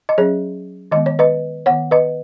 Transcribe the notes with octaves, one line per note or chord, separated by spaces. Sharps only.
D#5
F#3 C#4 G#4 C#5
D#3 G#3 B3 D#5
C#5
B4 D#5
D#3 B3 C#5 F#5
B4 D#5